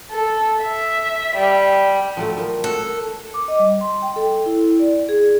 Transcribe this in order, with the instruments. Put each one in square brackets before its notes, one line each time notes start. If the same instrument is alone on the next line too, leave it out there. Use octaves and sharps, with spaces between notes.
[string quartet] A4
E5
G3
[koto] F3 F#3 A3
[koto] F3 [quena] A#4
[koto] F#4 [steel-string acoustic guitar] A4
[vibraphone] D6
D#5
G3
C6
G5
A4
E4
D5
G#4